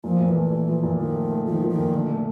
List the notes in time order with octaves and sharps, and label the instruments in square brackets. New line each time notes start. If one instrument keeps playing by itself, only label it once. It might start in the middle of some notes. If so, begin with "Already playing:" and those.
[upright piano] A#2 [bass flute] F3
[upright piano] A#2
[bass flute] E3
[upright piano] A3
A#2
F3
A#2
[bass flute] D#3 [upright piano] F3
[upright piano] A3
A3
[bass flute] D#3 [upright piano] F3
[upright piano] F3
[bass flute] D#3
[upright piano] A#2
[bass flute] D3 [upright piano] A3
[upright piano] A3